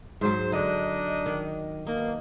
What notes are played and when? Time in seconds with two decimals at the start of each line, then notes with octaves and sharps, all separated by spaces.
0.21 G#2 F#3 C5
0.52 D3 D4 D#4 D#5
1.26 D#3
1.87 B2 A#3 D#4